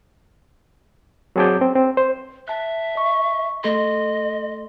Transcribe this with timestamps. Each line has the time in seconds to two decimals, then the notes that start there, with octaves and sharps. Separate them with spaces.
1.36 F#3 C4 G#4 A5 D6 G6
1.61 C4
1.76 C4
1.97 C5
2.48 E5 A5 F#6
2.95 D#5 C#6
3.64 A3 A4 D#5 C6